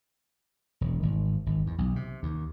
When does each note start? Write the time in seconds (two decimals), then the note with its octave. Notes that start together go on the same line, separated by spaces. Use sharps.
0.81 E1
1.03 G#1
1.46 G#1
1.66 E2
1.78 B1
1.96 C3
2.23 D#2